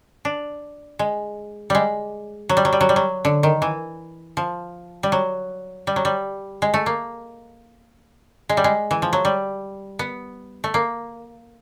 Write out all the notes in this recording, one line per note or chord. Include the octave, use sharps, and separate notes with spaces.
D4
G#3
G3 G#3
F#3
G3
F#3
G3
F#3
G3
F#3
D3
D#3
E3
F3
G3
F#3
G3
F#3
G3
G#3
A3
A#3
G#3
G3
G#3
E3
F3
F#3
G3
B3
A3
A#3